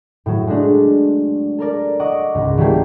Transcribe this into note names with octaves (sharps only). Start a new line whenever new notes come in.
A2 F#3
G#3 A3 D4
A4 A#4 D5
D#5 F#5 C#6 D6
C#2 G#2
E3 F#3 G3 A3 A#3 G4